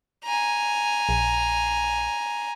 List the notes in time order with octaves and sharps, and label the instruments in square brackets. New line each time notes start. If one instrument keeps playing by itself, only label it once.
[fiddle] G#5 A#5
[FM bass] A#1